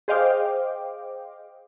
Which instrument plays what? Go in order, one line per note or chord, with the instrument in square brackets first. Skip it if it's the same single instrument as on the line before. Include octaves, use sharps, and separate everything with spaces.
[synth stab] G#4 C5 D#5 F5 G5 D6